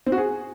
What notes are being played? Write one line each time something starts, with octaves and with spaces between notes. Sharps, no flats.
C4
F#4
G#4